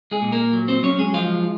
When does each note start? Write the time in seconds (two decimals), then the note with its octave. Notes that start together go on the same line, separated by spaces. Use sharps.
0.11 G#3 G#4
0.22 A#2
0.32 A#3 A#4
0.53 F#3
0.68 C4 C5
0.83 F#3 C#4 C#5
0.99 G#3 G#4
1.14 F3 G#3 F4